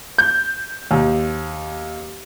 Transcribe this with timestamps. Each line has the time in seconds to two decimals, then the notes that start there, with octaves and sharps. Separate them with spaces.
0.18 G6
0.91 D#2